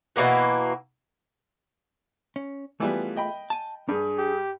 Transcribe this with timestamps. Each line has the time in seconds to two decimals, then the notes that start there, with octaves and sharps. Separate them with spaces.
0.16 B2 E3 A#3 F#4
2.36 C#4
2.80 E3 G3 A3 B3 F4 G#4
3.17 D#5 G5 B5
3.50 G#5 A5
3.89 G2 D4 G#4
4.18 G4